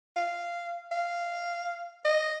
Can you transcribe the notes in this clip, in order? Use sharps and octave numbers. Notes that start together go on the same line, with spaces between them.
F5
F5
D#5